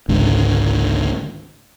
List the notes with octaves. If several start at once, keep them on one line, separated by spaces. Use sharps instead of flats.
G#1 C#2 G#2 D3